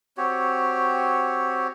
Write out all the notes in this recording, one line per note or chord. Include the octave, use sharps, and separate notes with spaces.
C4 F#4 G4 C#5